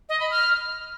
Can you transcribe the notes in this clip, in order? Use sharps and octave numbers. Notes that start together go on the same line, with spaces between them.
D#5
B5
F6